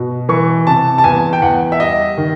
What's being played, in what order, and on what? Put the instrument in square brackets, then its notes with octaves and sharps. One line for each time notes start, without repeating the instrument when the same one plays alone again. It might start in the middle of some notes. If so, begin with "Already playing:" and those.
Already playing: [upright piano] B2
E3 C#6
C3 A5
A5
E2 G#5
G5
E2 F#5
E5
G3 D#5
D#3